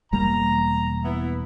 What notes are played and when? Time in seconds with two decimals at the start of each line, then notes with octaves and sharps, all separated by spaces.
0.13 E1 G3 A#3 A#5
1.05 B3 E4